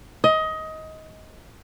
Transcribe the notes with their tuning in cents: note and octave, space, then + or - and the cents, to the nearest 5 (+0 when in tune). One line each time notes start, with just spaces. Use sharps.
D#5 +20